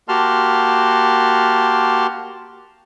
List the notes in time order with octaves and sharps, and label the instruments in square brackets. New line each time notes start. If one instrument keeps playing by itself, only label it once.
[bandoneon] A#3 F#4 G4 A5 C6 F6